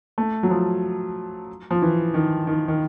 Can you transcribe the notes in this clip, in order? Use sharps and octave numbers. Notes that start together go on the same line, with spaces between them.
A3
F#3
F3
F3
E3
D#3
D#3
D#3